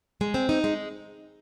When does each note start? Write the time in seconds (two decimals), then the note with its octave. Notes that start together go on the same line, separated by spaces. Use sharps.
0.21 G#3
0.34 C4
0.49 D#4
0.64 G#3